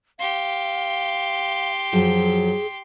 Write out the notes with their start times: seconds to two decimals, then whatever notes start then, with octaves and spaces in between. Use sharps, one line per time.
0.19 G4 F5 C6
1.93 F#2 F3 F#3 G#4